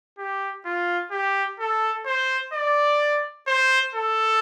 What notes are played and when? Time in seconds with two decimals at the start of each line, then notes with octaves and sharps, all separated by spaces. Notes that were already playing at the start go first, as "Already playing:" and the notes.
0.18 G4
0.65 F4
1.12 G4
1.59 A4
2.06 C5
2.53 D5
3.47 C5
3.95 A4